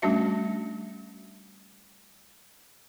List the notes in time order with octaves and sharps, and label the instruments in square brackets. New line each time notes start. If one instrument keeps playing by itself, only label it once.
[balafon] G3 A3 C#4 D4 F#4 E5